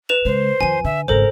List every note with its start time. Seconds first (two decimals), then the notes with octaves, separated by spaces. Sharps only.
0.09 B4 E7 F7
0.25 C#3 G#3 C5
0.61 F2 D#3 G#5 D#7
0.85 D3 E5
1.08 G#1 C#3 A4 A#4 C5